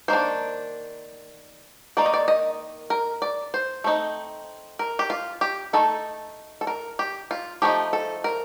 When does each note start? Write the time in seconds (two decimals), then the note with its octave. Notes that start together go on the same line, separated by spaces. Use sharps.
0.08 D#3 A#3 D4 C5
1.97 D#3 A#3 D#4 D5
2.06 D#5
2.14 D5
2.28 D#5
2.90 A#4
3.22 D5
3.54 C5
3.84 A3 C4 D#4
4.79 A#4
4.99 G4
5.10 F4
5.41 G4
5.73 A3 D#4 A4
6.61 A4
6.67 A#4
6.99 G4
7.31 F4
7.62 F3 A3 D#4 G4
7.93 A4
8.24 A#4